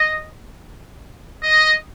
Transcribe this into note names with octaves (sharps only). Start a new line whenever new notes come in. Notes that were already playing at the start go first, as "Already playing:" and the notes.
Already playing: D#5
D#5